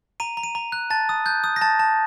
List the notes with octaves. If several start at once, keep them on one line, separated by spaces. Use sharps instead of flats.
A#5 D#7
A#5
D#7
A#5
F#6
A5 A6
D#6
F#6 G6
D#6
A#6
A5 A6
A5